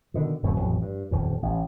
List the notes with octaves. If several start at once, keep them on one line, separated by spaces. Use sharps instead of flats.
B2 D3 D#3
D1 F#2 B2 A3
A1 F2 F#3
G2
D#1 F2
A1